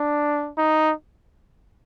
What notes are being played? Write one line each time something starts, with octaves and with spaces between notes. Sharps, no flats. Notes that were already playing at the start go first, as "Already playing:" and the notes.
Already playing: D4
D#4